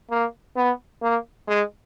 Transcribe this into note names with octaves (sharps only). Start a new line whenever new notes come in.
A#3
B3
A#3
G#3